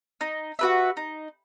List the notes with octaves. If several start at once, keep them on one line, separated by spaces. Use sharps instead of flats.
D#4
F#4 B4 E5
D#4